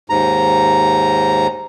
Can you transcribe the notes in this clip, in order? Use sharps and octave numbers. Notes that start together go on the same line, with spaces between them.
D#2 G#2 A#5